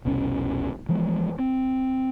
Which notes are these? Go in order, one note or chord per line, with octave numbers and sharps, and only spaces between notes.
F1 C2 B2 C#4
E3 F3 G#3 B3
C4